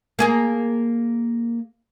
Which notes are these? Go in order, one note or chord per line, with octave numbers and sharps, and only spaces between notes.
A#3 G#4 A#4